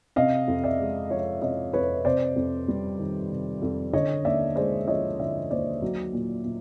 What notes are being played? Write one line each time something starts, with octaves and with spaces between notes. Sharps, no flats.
C3 D#5 F5
F2
D5 E5
G#3
F3 C#5 D#5
C3 C#5 D#5
F2 B4 C#5
C3 C5 D5
F2
G3
D#3
C3
F2
D3 C#5 D#5
D#2 D5 E5
G#3 C5 D5
F3 C#5 D#5
D3 D5 E5
D#2 C5 D5
F#3
A#2
A#2